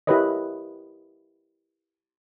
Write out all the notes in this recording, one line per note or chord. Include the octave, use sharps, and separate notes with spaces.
E4 G4 A#4 B4 C#5 D#5